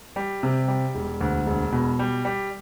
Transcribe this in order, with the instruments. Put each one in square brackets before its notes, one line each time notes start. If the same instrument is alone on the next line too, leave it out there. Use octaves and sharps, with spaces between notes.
[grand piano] G3
C3
G3
E1
D2
E1
B2
G3
G3